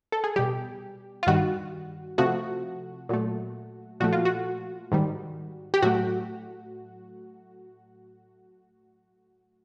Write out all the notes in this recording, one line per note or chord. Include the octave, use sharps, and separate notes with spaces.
A4
G#4
B2 G3 G4
F4
G2 D#3 G3 F#4
C3 F3 A3 F#4
A#2 F#3 A3
A#2 F3 A3 F#4
F4
F#4
G#2 D#3 G3
G4
A2 F#3 A3 F#4